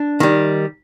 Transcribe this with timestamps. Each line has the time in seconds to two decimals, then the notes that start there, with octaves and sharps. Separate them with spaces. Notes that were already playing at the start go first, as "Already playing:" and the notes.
Already playing: D4
0.20 D#3 G3